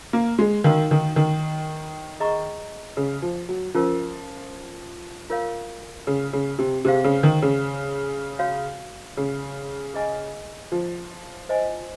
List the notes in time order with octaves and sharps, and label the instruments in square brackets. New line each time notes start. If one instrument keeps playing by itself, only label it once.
[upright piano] A#3
G#3
[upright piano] D#3 [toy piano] D#4 F#4 A#4 F5
[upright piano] D#3
D#3
[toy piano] G#4 D#5 A#5 C#6
[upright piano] C#3
F3
F#3
[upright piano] F3 [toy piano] C#4 F4 A#4
[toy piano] F4 A#4 C#5 F5
[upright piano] C#3
C#3
C3
[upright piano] C3 [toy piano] G#4 C5 F5
[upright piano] C#3
D#3
C#3
[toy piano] F#4 C#5 F5
[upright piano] C#3
[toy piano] G#4 D#5 G#5
[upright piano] F3
[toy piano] C5 D#5 G#5